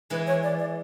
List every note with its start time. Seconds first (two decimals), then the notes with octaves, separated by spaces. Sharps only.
0.10 E3 G#3 B4
0.27 C#5
0.43 D5
0.58 D5